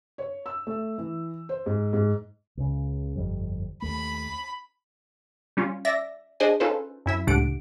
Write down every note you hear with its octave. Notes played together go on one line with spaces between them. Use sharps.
C#5
E6
A3
E3
C5
G#2
G#2
C#2 C#3
G1 F2 G3
D#2 A3 B5
G3 C#4 F4
D5 E5 A#6
D4 G#4 C5 D#5 G#5
C#4 D#4 F4 A4 B4 C5
F#2 E4 E5
C#2 A2 D4 G4 F#5 D7